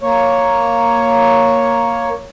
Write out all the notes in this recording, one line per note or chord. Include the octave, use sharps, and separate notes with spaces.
A#3 C#5